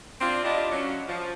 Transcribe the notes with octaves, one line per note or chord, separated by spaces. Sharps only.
C4 D4 F4
D4 E4 F4 G4 D5 D#5
F#3 C#4
F3